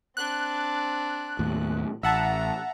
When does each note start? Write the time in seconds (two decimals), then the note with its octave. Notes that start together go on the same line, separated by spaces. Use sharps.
0.17 C4 D4 F#6
1.39 D#2 A2
2.03 A1 E5 F#5 A5 A#5